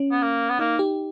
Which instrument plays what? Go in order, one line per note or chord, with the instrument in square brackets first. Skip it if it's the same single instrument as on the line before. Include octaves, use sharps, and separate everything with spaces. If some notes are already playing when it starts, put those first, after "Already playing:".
Already playing: [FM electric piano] C#4
[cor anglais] B3
A#3
B3
[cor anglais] A#3 [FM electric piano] D#4
[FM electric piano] G4